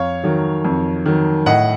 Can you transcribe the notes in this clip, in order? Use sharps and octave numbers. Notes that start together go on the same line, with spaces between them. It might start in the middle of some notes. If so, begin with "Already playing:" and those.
Already playing: F2 C#5 F5
D#3 F#3
F2
D#3 F#3
A2 D#5 F#5